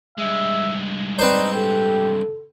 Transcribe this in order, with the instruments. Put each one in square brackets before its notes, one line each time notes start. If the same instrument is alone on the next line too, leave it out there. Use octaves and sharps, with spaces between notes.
[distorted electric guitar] G2 G#3 [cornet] E5
[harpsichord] C4 B4 C5 [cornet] D#4 [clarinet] D5
[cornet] G4 [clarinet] A4